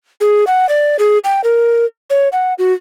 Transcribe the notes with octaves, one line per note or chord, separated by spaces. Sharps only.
G#4
F#5
D5
G#4
G5
A#4
C#5
F#5
F#4